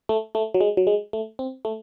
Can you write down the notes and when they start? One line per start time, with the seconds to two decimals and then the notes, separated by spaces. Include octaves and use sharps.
0.09 A3
0.35 A3
0.54 F#3
0.61 G#3
0.77 F#3
0.87 G#3
1.13 A3
1.39 C4
1.65 A3